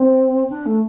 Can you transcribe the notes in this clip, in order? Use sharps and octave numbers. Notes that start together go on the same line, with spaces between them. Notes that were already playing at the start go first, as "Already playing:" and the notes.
Already playing: C4
D4
A3